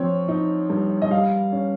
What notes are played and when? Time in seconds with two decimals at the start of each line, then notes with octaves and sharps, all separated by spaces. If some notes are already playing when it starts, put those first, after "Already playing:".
Already playing: F3 C4 C#5
0.28 D#4
0.70 G2
1.02 D#5
1.10 G3 F5
1.52 C#4